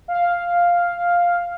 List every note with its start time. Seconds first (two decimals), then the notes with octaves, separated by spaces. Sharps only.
0.08 F5